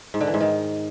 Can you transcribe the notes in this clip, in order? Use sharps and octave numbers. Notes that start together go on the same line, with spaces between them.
G#2
D3
E3
G#2
D#3